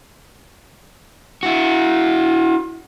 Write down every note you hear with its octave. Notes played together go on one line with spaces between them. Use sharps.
E4 F#4